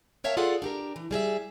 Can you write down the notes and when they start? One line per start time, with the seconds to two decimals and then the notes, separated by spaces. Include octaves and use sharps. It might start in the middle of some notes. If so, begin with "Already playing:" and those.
0.24 A#4 C#5 E5 F5 G5 A5
0.37 F4 G#4 A4 D5 F5 F#5
0.62 D4 G4 A#4
0.96 E3
1.11 G3 G#4 D#5 E5